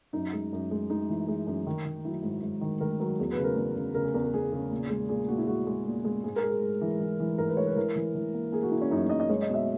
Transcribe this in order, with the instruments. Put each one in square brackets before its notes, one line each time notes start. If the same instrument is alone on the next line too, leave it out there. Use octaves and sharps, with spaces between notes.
[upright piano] F#2 D#4
G#3
F#2
G#3
G#3 D#4
E3
G#3
F#2
D#3
D#3
F#3 E4
G#2
G#2
D#3
D#3 A#4
F#3 A#4
E2 G#4
B4
C#3
A#4
E2
C#3
C#3 A#4
G#4
E2 A#4
A#4
E2 G#4
C#3
A#2
G#3
A#2 G#4
A#2 F#4
E4
G#3 F#4
G#3
A#2
G#3
G#2 G#4
A#4
G#3
G#4
G#2
E3
E3
E3
G#2 A#4
B4
G#3 C#5
B4
E3 A#4
E3
E3
A#3
A#3 G#4
F#4
A#3 E4
C#4
F#2 D#4
F#2 D#5
D#5
G#3 C#5
D#5
B2
E5